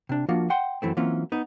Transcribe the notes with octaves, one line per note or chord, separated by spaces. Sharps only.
C3 D4
F3 A#3 D4 F4 F#4
F#5 G5 C6
F#2 E3 A3 C4
E3 F#3 A#3 C4 C#4 F4
B3 D#4